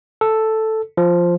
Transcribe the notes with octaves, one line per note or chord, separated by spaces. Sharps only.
A4
F3